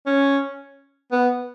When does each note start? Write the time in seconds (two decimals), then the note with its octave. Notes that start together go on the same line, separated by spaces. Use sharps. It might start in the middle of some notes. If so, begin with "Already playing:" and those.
0.06 C#4
1.12 B3